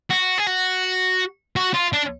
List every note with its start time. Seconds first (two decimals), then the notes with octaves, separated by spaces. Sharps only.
0.10 F#4
0.38 G#4
0.47 F#4
1.56 F#4
1.74 F4
1.93 D4